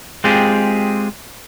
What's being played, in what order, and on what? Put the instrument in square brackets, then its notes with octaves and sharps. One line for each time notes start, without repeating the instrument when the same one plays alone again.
[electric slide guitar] G#3 C4 F4 G4 G#4